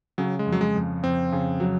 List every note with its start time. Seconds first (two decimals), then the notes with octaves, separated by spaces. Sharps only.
0.18 C#3 F#3
0.39 G#3
0.46 F2
0.52 F#3
0.61 G#3
0.75 F2
1.03 F2 C4
1.32 C#3
1.60 F#3